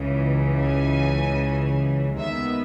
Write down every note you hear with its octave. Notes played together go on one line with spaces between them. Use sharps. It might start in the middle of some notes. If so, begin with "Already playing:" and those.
Already playing: C#2 C#3 E3
G#5
D#2 D#3 G#3 B3 E5